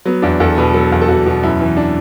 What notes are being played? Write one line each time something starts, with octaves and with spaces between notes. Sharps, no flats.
F#3 B3
E2 D4
E2 A4
B2 B4
F#3 A4
E2
A4
E2 F#4
B2
F#2 E4
E3
D4